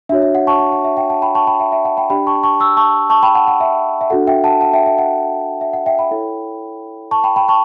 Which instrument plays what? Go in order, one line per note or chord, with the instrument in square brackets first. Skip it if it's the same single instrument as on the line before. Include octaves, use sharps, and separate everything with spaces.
[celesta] D4 F#4 C#5 E5
E5
F#5
A5 C#6
F#5
F#5
E5
E5 G5
F#5 A5
G5 B5
A5 C#6
G5 B5
E5 G5
E5 G5
F#5 A5
G5 B5
D4 G4 D5 G5 B5
A5 C#6
A5 C#6
C#6 E6
A5 C#6
A5 C#6
G5 B5
F#5 A5
F#5
E5
E5
D4 F#4 A4 F#5
E5 G5
F#5 A5
F#5 A5
E5 G5
E5
F#5
E5
F#5
E5 G5
G5 B5
E4 A4 C#5
A5 C#6
G5 B5
G5 B5
A5 C#6